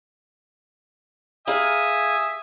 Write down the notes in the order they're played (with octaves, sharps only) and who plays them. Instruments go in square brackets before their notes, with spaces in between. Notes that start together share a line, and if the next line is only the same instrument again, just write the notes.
[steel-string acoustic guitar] G#4 F5 A#5 [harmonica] E5 G#5 D#6